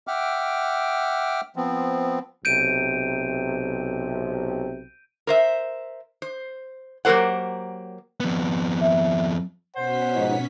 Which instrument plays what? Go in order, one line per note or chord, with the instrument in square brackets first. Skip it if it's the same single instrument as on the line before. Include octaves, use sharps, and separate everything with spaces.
[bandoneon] E5 F#5 G5 D6 F6
F3 B3 C4
[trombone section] B1 C3 [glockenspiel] G6 D7 D#7
[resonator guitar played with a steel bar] A#4 C5 E5
C5
F#3 A#3 G4 A#4 C5 F#5
[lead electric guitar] F2 B3
[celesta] E5
[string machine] B2 C#4 B6 [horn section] C5 [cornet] F#5
[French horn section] G#2 F3 D#4